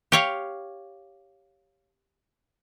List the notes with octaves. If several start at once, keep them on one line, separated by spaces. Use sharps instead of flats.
G4 C#5 F5